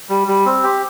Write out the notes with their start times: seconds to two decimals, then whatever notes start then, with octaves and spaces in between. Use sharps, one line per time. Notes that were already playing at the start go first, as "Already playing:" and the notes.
0.09 G3
0.27 G3
0.46 C4
0.63 G4